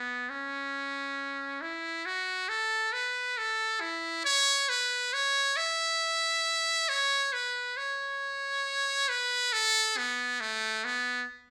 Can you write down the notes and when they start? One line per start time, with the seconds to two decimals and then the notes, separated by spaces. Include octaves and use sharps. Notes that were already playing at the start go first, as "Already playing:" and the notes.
Already playing: B3
0.30 C#4
1.61 E4
2.06 F#4
2.49 A4
2.92 B4
3.38 A4
3.80 E4
4.25 C#5
4.69 B4
5.13 C#5
5.57 E5
6.89 C#5
7.33 B4
7.77 C#5
9.09 B4
9.53 A4
9.97 B3
10.41 A3
10.85 B3